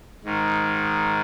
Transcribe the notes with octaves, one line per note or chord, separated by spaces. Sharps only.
G#2 D#3